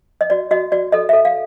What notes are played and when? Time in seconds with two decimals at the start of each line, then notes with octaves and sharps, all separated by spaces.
0.21 D#5
0.30 F#4 D5
0.51 F#4 D#5
0.72 F#4 D5
0.92 A4 D#5
1.09 E5
1.13 A4
1.25 F5